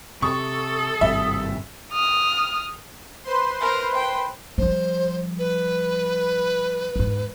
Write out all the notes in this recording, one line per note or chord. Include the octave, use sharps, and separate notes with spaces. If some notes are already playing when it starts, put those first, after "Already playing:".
C3 A4 C#6 D#6
G#1 G2 C3 E5
D#6 F6
B4 C5 C6
A#4
G5
F3 G3 C5
B4
E2 G#2